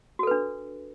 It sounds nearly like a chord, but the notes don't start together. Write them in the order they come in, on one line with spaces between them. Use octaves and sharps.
F#4 A4 B4 D4